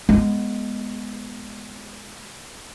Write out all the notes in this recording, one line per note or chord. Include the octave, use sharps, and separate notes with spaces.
G#3 B3